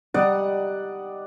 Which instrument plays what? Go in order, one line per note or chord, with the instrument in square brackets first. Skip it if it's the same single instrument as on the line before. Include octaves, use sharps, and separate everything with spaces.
[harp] G3 D#4 [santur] D5 F#5 D#6